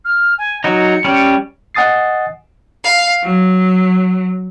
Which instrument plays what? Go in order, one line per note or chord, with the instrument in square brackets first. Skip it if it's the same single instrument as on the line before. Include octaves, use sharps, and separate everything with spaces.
[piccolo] F6
G#5
[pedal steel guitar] F#3 D#4 [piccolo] C#7
[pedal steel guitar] G3 C#4
[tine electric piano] D#5 F#5 G#5 D#6 A6 C7
[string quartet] F5
F#3